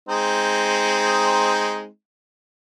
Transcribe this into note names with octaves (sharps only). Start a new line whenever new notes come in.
G#3 C4 D#4